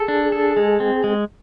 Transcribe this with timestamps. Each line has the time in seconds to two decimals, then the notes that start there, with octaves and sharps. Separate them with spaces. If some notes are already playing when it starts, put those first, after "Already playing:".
Already playing: G#4 A4
0.08 D4
0.32 A4
0.57 G#3
0.80 C4
1.04 G#3